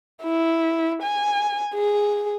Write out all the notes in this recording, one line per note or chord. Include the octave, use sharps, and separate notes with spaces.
E4
G#5
G#4